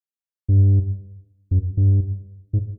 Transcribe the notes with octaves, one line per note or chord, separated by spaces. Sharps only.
G2
F#2
G2
G#2